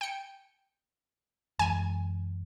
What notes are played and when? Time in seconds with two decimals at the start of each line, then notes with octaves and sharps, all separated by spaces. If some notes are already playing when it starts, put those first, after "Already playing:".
0.01 G5 C#7
1.59 F#2 E3 G#3 G#5 D#7